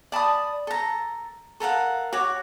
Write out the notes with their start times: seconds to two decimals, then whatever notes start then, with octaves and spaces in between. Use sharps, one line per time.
0.12 D5 A5 B5 D#6
0.67 A4 A#5
1.60 A4 A#4 F5 F#5
2.13 F#4 C#5 D6